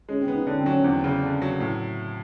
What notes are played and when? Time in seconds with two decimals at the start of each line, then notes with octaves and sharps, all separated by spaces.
0.09 G#3 C#4
0.21 C4
0.28 B3
0.34 D#4
0.46 D3 C#4
0.59 C4
0.66 F#3
0.72 C#4
0.84 E2 C4
1.04 C#3
1.23 D3
1.42 F#3
1.60 A2